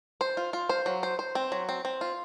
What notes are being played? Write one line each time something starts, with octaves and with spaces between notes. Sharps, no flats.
C5
F4
F4
C5
F#3
C5
C5
C4
F#3
C4
C4
F4